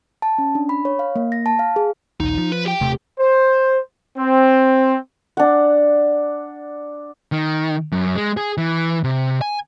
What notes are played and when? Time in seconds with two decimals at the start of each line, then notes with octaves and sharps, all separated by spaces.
0.22 A5
0.38 C#4
0.55 D4
0.69 B5
0.85 C#5
0.99 F5
1.16 A#3
1.32 A#6
1.46 A5
1.59 F5
1.76 G#4
2.20 A#1 D#2 D#4
2.38 F3
2.52 B4
2.65 G4 G5
2.81 D#1 C3 A3
3.19 C5
4.17 C4
5.37 D4 F#5
7.32 D#3
7.92 F#2
8.16 G#3
8.37 G#4
8.58 E3
9.04 C3
9.41 G#5